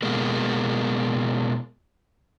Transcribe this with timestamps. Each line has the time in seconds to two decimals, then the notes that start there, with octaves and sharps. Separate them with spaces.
0.02 B2 G#3 A#3